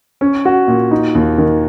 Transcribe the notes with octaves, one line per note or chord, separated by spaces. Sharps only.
C#4
F#4
A#2
D#4
D#2
D#3